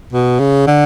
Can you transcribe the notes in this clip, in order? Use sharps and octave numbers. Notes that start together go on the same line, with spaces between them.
B2
C#3
D3